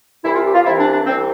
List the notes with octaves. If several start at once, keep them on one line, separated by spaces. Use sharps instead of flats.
C2 C3 E3 E4
F4
G4
F4
C2 C3 E3 E4
D4
D4
C2 C3 E3 C4